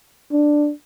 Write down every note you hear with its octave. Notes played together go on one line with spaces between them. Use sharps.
D4